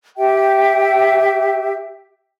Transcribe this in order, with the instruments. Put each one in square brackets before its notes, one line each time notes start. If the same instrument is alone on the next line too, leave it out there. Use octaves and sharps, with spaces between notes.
[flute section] G4 E5 G5